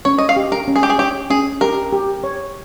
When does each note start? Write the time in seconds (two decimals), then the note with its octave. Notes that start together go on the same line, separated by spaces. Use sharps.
0.05 C#4 C#5
0.18 D#5
0.29 F5
0.36 G4
0.52 A#4
0.68 C#4
0.76 G#4
0.83 G4
0.90 G#4
0.98 G4 C#5
1.30 C#4 G#4
1.61 G4 A#4
1.92 G4
2.24 C#5